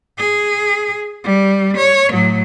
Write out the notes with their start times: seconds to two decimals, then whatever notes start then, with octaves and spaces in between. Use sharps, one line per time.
0.18 G#4
1.24 G3
1.77 C#5
2.11 A2 F#3